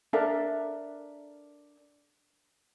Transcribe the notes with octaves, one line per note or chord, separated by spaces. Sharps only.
D4 A4 A#4 E5